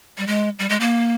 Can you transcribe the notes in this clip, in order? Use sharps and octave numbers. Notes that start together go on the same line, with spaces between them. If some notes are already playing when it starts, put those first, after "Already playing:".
G3
G#3
G3
G#3
A#3